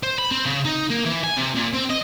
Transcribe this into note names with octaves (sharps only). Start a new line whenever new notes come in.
C5
B5
C4
C#3
D#4
A#3
E3
G#5
C3
A#2
C4
D#5